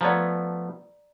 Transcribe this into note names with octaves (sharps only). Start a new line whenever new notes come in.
F3 A3 B3 D5 A#5